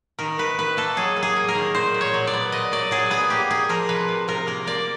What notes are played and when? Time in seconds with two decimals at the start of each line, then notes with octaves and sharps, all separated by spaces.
0.19 D#3 A#4
0.38 D#3 B4
0.58 D#3 B4
0.77 A#3 A4
0.97 F#3 G#4
1.16 A#3
1.23 G#4
1.37 A#3
1.48 A#4
1.55 D#3
1.74 A#2 C5
1.94 A#2
2.01 C#5
2.14 F#3
2.27 D5
2.33 B3
2.52 A#2 D#5
2.72 F#3 D5
2.91 F#3 G#4
3.11 B3 G#4
3.30 A#3 G4
3.51 A#3 G#4
3.69 F3 A#4
3.89 C3 B4
4.08 C3
4.28 C3 A#4
4.47 A#3 A#4
4.67 A#3 D5